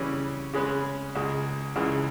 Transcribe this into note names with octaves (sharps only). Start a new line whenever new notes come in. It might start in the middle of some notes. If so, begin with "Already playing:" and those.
Already playing: C#3 E3 G3 C#4
C#3 G#3 C#4 G#4 B4
C#2 C#3 G#3
C#2 C#3 E3 G#3